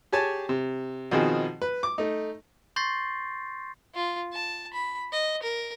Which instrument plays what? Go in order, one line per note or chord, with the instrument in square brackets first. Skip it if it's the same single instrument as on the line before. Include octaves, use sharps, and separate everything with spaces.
[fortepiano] G4 G#4 C#5 G#5 A5
C3
B2 D#3 F3 C4 D#4 G#4
B4
D6
A3 D#4
[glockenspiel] C6 C#6 G6 A6 A#6 C7
[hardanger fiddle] F4
A5
B5
D#5
A#4